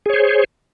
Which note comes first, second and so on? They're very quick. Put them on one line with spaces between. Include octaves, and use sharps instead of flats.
G#4 C#5 C5